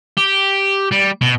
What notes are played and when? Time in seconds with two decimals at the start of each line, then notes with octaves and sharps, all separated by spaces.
0.17 G4
0.91 G3
1.21 B2